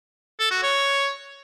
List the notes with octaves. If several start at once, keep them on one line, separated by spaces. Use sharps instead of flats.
A4
F#4
C#5